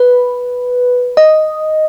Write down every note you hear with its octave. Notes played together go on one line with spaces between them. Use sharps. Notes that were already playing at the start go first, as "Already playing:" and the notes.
Already playing: B4
D#5